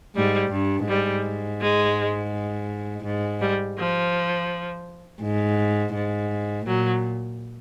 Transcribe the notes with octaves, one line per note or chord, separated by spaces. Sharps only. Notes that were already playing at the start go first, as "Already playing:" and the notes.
G#2 G3
G2
G#2 G3
G#3
G#2
G3
F3
G#2
G#2
A#2 F#3